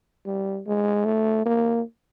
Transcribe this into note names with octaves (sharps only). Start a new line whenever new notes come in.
G3
G#3
A3
A#3